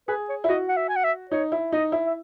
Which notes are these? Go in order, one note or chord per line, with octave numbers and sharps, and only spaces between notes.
G#4 B4
C#5
E4
F#4 D#5
F#5
E5
G#5
F#5
E5
D#4 C#5
E4
D#4 D#5
E4
E5